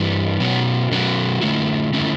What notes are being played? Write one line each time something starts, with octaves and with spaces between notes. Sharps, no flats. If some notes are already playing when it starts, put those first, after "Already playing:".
Already playing: G2 E3 G3
B2 F#3 C#4 F#4
B2 F#3 C#4 F#4
D3 A3 C#4 E4
D3 A3 C#4 E4